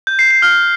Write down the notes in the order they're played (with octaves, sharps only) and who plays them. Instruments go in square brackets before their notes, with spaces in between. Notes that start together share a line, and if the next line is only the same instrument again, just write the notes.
[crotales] G6
C7
C7
F6